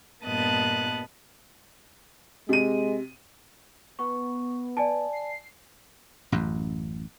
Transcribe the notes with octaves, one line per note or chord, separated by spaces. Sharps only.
G2 A#2 B3 D#5 A5 F#6
C3 G#3 D#7
B3 C#6
D5 G#5 A5
C7
A1 F#2